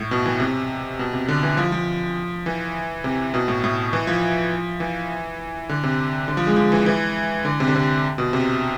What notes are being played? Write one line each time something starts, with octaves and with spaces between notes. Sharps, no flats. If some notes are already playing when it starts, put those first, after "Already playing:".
Already playing: A2
B2
E3
C3
B2
C3
D3
E3
F3
F3
E3
C3
B2
A2
A2
E3
F3
E3
D3
C3
D3
F3
G#3
F3
E3
E3
D3
C3
D3
C3
B2
C3